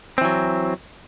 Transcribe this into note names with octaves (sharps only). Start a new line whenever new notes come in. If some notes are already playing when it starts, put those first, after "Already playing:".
E3 F#3 C4